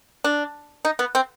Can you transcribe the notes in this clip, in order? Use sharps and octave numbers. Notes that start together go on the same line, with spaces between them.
D4
D#4
B3
C4